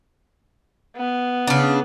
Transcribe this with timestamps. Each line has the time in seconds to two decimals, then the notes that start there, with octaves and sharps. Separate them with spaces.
0.97 B3
1.47 C#3 D4